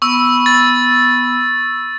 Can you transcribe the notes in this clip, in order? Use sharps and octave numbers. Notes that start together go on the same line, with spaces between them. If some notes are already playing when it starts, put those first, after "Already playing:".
B3 B5 C#6 E6
A6